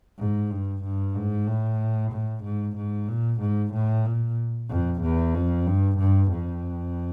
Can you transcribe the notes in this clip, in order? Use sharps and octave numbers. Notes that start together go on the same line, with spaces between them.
G#2
G2
G2
G#2
A2
A2
G#2
G#2
A#2
G#2
A2
A#2
F2
E2
F2
G2
G2
F2